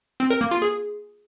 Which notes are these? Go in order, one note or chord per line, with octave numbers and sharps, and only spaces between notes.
C4
A#4
A#3
F4
G#4